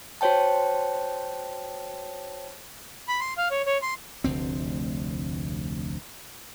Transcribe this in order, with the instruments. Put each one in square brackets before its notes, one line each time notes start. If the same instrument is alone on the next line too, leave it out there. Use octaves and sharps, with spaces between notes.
[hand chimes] F#4 C5 C#5 G5 A5
[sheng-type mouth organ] B5
C6
F5
C#5
C#5
C6
[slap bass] F1 D2 C4